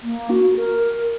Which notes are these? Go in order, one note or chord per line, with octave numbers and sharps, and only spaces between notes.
A#3
F#4
A#4